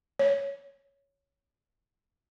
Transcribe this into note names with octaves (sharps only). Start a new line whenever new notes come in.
C#5